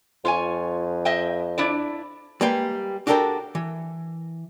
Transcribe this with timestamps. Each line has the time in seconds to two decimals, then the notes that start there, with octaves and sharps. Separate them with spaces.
0.25 F2 F4 C#5 G#5
1.05 D#5 E5 G5
1.58 D4 E4 D5
2.41 G3 G#3 A#3 B4 G5
3.07 D4 F#4 G4 A4 A#4 G5
3.55 E3